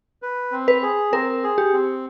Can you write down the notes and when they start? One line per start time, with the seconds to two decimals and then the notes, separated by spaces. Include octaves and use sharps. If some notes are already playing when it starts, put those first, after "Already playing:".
0.22 B4
0.52 C4
0.68 B4
0.82 G#4
1.12 C4 A#4
1.43 G#4
1.58 G4
1.73 C4